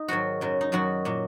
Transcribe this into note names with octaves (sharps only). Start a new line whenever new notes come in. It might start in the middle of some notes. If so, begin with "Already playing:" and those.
Already playing: D#4
G#2 D#3 F#3 F#4
F#2 C#3 F#3
D#4
F#2 D#3 F#3 F#4
A#2 F#3